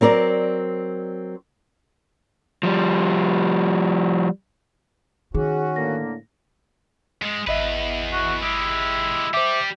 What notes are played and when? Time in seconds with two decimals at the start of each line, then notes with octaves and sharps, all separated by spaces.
0.01 F#3 C4 A#4 D5
2.63 F3 G3
5.34 D#3 C#4 F#4 G#4
5.76 A2 D3 A#3 A#6
7.22 G#2 G#3
7.47 G#1 E2 B4 D#5 E5
8.13 F#4
8.42 G#3 E4 G4
9.34 G3 C5 E5 D6